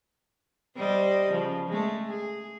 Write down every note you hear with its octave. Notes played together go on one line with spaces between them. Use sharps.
G3 C5 D#5
C#3 F3
G#3 A3
G#4